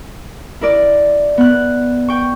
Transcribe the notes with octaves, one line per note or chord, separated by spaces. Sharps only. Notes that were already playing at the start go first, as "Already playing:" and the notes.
E4 A#4 D5
B3 F#6
G5 C#6